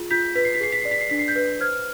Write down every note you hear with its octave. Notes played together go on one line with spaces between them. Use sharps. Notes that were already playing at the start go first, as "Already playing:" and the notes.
Already playing: F4 G#4
F4 G6 B6
B4 B6
C7
B6
G#4 C7
B6
D5 C7
B6
C7
D4 B6
C7
G6 B6
B4
C5 F6 G#6